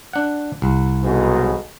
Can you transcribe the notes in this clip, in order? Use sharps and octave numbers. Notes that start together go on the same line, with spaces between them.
D4 F#5
C2
B1 G#2 B2